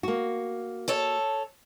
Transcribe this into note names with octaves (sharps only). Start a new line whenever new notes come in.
A#3 F#4
A4 C#5 A5